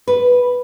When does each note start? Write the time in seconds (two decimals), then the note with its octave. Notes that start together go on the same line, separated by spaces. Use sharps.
0.07 B4